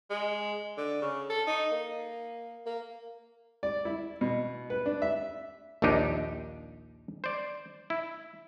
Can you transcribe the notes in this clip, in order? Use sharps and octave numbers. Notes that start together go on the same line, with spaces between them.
G#3
D3
C#3
A4
D#4
A#3
A#3
D5
E4
B2
B4
D4
E5
A#1 D#2 D#3 D4 D#4 G4
C5 D5
E4